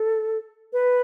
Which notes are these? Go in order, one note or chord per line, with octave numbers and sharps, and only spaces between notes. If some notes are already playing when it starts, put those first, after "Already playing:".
Already playing: A4
B4